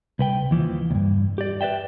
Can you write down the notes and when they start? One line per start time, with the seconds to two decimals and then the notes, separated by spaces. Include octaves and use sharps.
0.19 C2 B4 G5
0.51 D#2 E3 F3
0.91 D2 G2
1.38 G4 D5
1.61 B4 D5 E5 G5